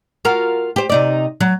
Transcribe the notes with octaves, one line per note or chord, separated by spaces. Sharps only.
F4 F#4 A#4
G4 C5
C3 D#4 D5
F#3